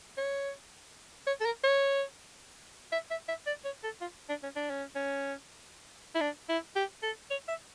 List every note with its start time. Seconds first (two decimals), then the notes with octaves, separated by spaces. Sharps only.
0.18 C#5
1.27 C#5
1.41 A4
1.45 A#4
1.64 C#5
2.92 E5
3.11 E5
3.28 E5
3.47 D5
3.65 C#5
3.84 A4
4.01 F4
4.29 D4
4.43 C#4
4.56 D4
4.70 C#4
4.96 C#4
6.15 E4
6.21 D4
6.49 E4
6.76 G4
7.03 A4
7.31 C#5
7.48 E5